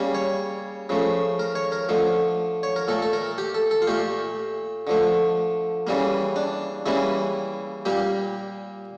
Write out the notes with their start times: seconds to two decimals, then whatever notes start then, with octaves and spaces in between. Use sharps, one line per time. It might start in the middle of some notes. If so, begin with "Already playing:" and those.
Already playing: C#3 G3 A#3
0.15 C#5
0.89 C#3 F3 A3
1.39 A#4
1.55 C#5
1.72 A#4
1.89 D3 F3 A3
2.63 C#5
2.76 A#4
2.88 A#2 A3 A4
3.02 A4
3.13 A#4
3.38 G4
3.54 A4
3.71 A4
3.82 F4
3.87 A#2 A3 G4
4.87 D3 F3 A3
5.87 C#3 E3 G3 A#3
6.36 D4
6.86 C#3 E3 G3 A#3 E4
7.85 A#2 G3 A#3 G4